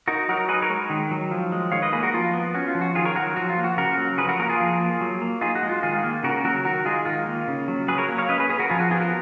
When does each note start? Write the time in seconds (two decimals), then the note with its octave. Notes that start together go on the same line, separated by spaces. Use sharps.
0.08 D#4 F#4 A#4
0.29 F#3 F#4 A#4
0.48 D#4 G#4 B4
0.62 A#4 C#5
0.70 G#3
0.90 D#3
1.11 F#3
1.31 F3
1.52 G#3
1.72 D#3 C#5 F5
1.82 B4 D#5
1.93 A#3 G#4 B4
2.03 F#4 A#4
2.14 F3 F4
2.33 B3
2.54 C#4 F#4
2.68 F4
2.75 F3
2.81 F#4
2.95 D#3 F4 G#4
3.05 A#4 C#5
3.16 F#3 F#4 A#4
3.36 F3 F#4
3.50 F4
3.57 A#3
3.64 F#4
3.77 C#3 F#4 A#4
3.98 F#3
4.18 F3 G#4 B4
4.29 F#4 A#4
4.39 A#3 F#4 A#4
4.49 F4 G#4
4.60 F3
4.80 A#3
5.01 F#3
5.21 A#3
5.41 D#4 F4 G#4
5.55 F#4
5.63 G#3
5.69 F4
5.83 D#3 F4 G#4
6.04 A#3
6.23 C#3 F#4 A#4
6.44 F#3 F#4 A#4
6.65 D#3 F#4 A#4
6.85 G#3 F4 G#4
7.05 D#3 F4
7.26 A#3
7.48 C#3
7.68 F#3
7.88 F#3 G#4 B4
7.98 A#4 C#5
8.08 A#3
8.18 C#5 F5
8.29 C#4 B4 D#5
8.40 G#4 B4
8.50 C#4 G#4 B4
8.59 F#4 A#4
8.70 F3 F4 G#4
8.80 F#4
8.91 B3 F4 G#4
9.00 F#4 A#4